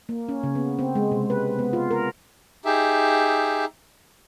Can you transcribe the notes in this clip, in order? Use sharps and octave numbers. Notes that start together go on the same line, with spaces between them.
A#3
C#4
C#3
B3
C4
G#3
C3
B4
B3
F4
A#4
D#4 G4 G#4 E5